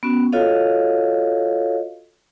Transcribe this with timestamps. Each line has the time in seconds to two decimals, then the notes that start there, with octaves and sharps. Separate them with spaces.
0.03 B3 C#4 F#4
0.32 F4 F#4 A4 C#5 D#5 F5